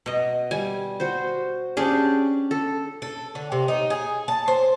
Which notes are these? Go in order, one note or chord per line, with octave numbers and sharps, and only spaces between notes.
B2 D#5
G3 G#5
F#4 C5
C#4 D4 G4 G#4
A4
A4
D3
C3
D#4
G#4
A5
C5